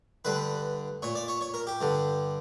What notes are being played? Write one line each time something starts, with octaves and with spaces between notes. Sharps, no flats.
G2 D3 B4
A#2 C#5
D5
C#5
C#5
A#4
G4
G2 D3